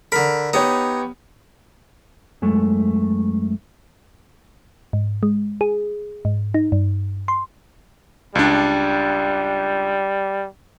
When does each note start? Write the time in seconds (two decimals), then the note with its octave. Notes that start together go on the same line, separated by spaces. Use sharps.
0.12 D3 A#4 B5
0.53 B3 D#4 G4 C#5
2.42 F#2 G#3 A3
4.93 G#2
5.23 G#3
5.61 G#4
6.25 G#2
6.54 D#4
6.72 G2
7.28 C6
8.35 C#2 G3 D4